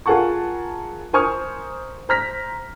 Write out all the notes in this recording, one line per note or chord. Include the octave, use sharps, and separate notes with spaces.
F4 G#4 A#4 F#5 A5 C#6
A#4 C5 G#5 C#6 D#6 F6
C5 A#5 F6 A#6 B6